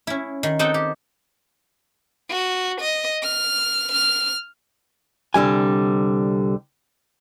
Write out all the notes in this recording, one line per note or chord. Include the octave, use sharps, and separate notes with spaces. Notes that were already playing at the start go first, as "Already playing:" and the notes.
C#4 E4
D#3
C4 D#4 A4 D#5 F#5 G5
G4
F#4
D#5
F6
F6
C2 D3 G3 G#5